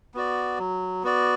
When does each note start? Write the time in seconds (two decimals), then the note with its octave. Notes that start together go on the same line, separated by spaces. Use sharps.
0.14 B3 F#4 D5
0.59 F#3
1.03 B3 F#4 D5